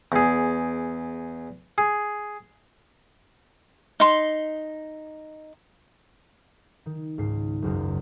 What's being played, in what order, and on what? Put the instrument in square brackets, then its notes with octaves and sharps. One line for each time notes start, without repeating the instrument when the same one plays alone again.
[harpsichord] E2 G#4
G#4
[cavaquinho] D#4 C6
[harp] D#3
C#2 G#2 C7
F#1 C#2 F#2